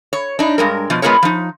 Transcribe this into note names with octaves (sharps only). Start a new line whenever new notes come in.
C#5
D4 D#4
G2 G#3 A#4
B2 F3
G#3 B3 F4 G#4 A#4 C#5
F3 D#4